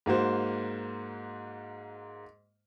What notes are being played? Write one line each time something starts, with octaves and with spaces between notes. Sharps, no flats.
G#2 A#3 F#4 C5